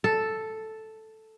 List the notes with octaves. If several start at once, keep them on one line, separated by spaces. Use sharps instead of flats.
A4